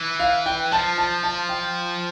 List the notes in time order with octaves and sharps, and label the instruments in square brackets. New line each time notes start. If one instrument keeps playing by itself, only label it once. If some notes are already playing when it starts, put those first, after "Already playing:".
Already playing: [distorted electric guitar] E3
[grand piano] F5
G5
[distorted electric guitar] F3 [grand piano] A5
[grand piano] A5
A5
G5